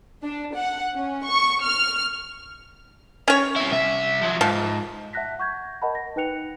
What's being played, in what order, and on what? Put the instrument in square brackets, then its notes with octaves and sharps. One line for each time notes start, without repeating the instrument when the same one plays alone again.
[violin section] D4
F#5
C#4
C#6
F6
[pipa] C#4 C#5
[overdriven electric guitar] C4 E4
C2 E5
F3 F#3
[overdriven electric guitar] G#2 [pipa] F3
[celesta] E5 F#5 A5 F#6 A#6 B6
F#5 C#6 G6 G#6
A#4 D#5 F#5 A5 B5
A#6
D#4 B4 G5 F#6 C#7 F7